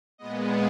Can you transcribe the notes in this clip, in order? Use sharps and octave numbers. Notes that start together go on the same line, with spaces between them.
A#2 G#3 B3 D#5